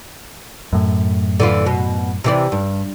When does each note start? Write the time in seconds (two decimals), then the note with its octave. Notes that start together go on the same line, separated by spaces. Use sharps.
0.73 F#2 A2
1.40 D3 E3 F4
1.66 B2
2.24 C3 E3 D5
2.52 G2